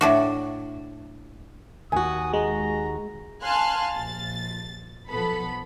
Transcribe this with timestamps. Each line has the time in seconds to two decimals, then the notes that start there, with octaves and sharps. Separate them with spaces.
0.01 A2 D4 F#4
1.92 D#2 F#4 G#5 D#6
2.33 G#3 A#5
3.43 F5 G#5 A5 C6 F6 F#6
3.91 A#1 A6
5.09 B1 F3 B3 A4 B5